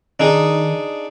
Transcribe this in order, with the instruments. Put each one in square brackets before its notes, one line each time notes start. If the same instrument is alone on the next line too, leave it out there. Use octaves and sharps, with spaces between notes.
[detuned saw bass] D#3 [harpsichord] D4 D#4 G#4